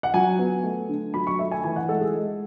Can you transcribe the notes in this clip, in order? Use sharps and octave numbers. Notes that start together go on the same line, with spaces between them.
F#5
F#3 G#5
B3
A3
D3
F#3 B5
C#6
A3 E5
G#5
E3 G#5
F#5
G#3 A4
G#4
G#3